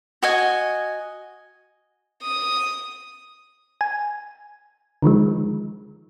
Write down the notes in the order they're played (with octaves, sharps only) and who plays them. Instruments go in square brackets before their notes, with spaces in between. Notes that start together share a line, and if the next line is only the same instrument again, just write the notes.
[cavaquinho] F#4 D#5 G#5
[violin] D#6
[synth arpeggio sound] G#5
D3 D#3 F3 G#3